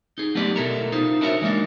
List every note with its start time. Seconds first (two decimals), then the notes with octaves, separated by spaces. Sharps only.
0.18 D#4 G#4
0.35 F#3 A3 B3 G4 B4 D5
0.56 B2 E4 A4 A#4
0.92 D#4 F4 C5
1.21 D4 E4 F#4 A#4 C#5 E5
1.42 E3 G#3 A#3 D4 D#4